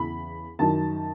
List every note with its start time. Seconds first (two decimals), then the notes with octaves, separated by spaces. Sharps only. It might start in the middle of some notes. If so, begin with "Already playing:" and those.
Already playing: E2 C#3 E3 B5
0.59 F#2 D#3 A5